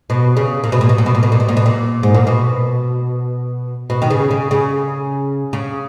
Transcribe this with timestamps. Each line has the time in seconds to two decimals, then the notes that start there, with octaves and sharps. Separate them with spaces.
0.10 B2
0.37 C#3
0.64 A#2
0.72 B2
0.81 A#2
0.89 B2
0.98 A#2
1.06 B2
1.15 A#2
1.23 B2
1.32 A#2
1.40 B2
1.49 A#2
1.57 B2
1.66 A#2
2.03 G#2
2.15 A#2
2.27 B2
3.90 B2
4.02 D#3
4.10 C#3
4.31 C#3
4.51 C#3
5.53 C#3